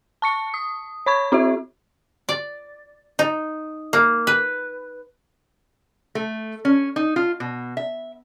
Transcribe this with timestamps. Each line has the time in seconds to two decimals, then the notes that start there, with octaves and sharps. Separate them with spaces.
0.22 A5 C#6 C#7
0.54 D#6
1.06 C#5 B5 C#6 G#6
1.32 C4 E4 F#4 E5
2.29 D5
3.19 D#4
3.93 A#3
4.27 B4
6.15 A3
6.65 C#4
6.96 D#4
7.16 F4
7.40 B2
7.77 E5